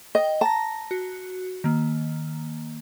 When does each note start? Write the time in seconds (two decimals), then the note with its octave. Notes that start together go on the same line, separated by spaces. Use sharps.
0.15 D#5 G5
0.41 A5 A#5 A#6
0.91 F#4
1.64 D#3 A#3